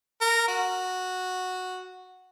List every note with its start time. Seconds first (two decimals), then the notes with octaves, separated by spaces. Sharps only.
0.21 A#4
0.48 F#4